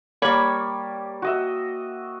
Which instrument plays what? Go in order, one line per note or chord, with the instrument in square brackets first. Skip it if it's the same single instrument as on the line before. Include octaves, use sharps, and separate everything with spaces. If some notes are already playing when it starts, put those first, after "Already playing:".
[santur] G3 A#3 [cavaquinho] C#5 B5 C#6
[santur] F#4 D#5 E5